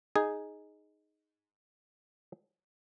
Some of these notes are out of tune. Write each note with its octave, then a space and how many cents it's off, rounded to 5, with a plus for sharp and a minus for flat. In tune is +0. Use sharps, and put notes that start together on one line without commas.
D#4 +0 G#4 +0